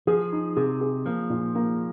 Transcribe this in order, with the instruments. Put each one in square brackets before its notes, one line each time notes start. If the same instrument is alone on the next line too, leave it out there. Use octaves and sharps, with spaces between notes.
[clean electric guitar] F3 [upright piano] G#4
[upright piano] D#4
[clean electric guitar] C3 [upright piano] G#4
[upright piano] G#4
[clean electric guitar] F3 [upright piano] A#3
[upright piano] A#2
A#3